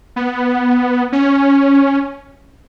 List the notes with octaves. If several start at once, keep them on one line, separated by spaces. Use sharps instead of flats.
B3
C#4